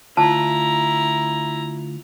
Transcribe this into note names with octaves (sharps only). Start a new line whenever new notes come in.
D2 E4 F4 A5 A#5